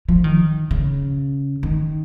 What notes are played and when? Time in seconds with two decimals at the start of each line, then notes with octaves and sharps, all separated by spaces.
0.09 F3
0.24 D#3
0.71 C#3
1.63 D#3